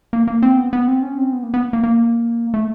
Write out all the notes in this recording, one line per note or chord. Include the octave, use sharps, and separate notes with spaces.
A#3
A#3
C4
B3
B3
C4
C#4
C4
B3
A#3
B3
A#3
A#3
A3